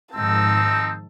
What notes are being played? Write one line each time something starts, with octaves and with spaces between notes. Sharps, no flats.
G#2 D#3 F3 C4 D#4 A5 E6